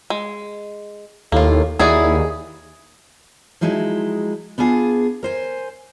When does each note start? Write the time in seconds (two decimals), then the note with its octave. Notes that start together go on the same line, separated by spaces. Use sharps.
0.10 G#3
1.32 D#2 A2 A#3 F4
1.79 D#2 D#4 E4 F#4 G#4 D5
3.61 F3 F#3 G#3 D#4 E4
4.58 B3 D4 F4 G#4
5.23 A#4 C5 G#5